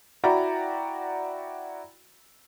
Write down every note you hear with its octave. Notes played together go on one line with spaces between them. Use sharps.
E4 F#4 D5 G5 A#5 B5